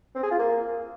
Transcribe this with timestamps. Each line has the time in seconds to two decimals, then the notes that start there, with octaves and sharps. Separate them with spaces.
0.15 C4
0.23 G#4
0.31 F4
0.39 A#3